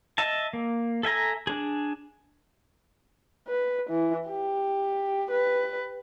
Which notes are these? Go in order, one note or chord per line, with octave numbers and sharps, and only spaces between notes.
D#5 E5 A5
A#3
A4 E5 G#5 A#5
D4 G#4
B4
E3
G4
B4